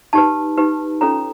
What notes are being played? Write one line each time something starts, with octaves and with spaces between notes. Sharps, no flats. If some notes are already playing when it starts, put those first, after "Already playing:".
D#4 G4 B4 A5
D#4 G4 B4
C#4 F4 A4 C#5 A#5